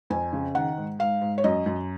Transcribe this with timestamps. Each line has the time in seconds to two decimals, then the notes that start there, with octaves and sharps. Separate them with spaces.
0.10 F2 G#5
0.33 C#3
0.55 D#3 F#5
0.77 G#2
0.99 G#2 F5
1.22 G#2
1.38 C#5
1.44 F#2 D#5
1.66 F#2